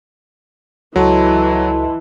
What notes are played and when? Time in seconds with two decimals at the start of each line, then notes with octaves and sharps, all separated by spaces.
0.96 C#2 E3 F#3 F#4 A4 D#5 A5 C6